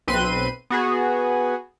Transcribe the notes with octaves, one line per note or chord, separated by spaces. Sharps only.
B1 C4 B4 C6 D#7
B3 F#4 G#4